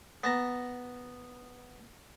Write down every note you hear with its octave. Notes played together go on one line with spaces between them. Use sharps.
B3 A5 A#5